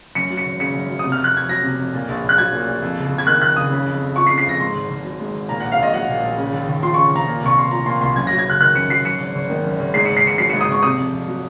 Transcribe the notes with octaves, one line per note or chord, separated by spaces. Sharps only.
F#2 C#7
F#3
C#7
G#1
C#3 C#7
F#2
F#3
D#6
C3
F6
F2
F#6
F2 G#6
F#3 A#6
C3
F2
A#2
A#1
A#1
F#6
F#3 G#6
A#2
A#1
F2
F#1
F#1
G#6
D#3 F#6
F2 F#6
F#1 D#6
C#3
F2
F2
F3 C#6
C7
C#3
C7
F2 A#6
G#2 C6
G#1
G#1
F#3
G#2
G#1
A#2 A#5
F#5
A#1
F5
A#1 D#5
F#3 F#5
A#2
A#1
C#3
D#2
D#2
F3 C6
C#6
C#3
D#2 A#5
A#2
C2 C#6
C2 C6
F3 A#5
A#2 C6
C2 C6
F#2 G#6
A#6
F#3
G#6
F#1 F#6
D#3 F#6
F#2 C#7
F#3 C7
F#2 C#7
G#1
G#1
D#3
F#2
G#1
G#2 C7
C#7
G#1
C7
G#1 C#7
F#3 C7
C#7
G#2
D#6
G#1 C#6
C3 D#6
F2
F2
F#3